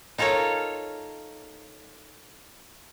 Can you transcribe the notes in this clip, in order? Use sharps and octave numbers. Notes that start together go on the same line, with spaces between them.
D#4 F4 A4 A#4 C#5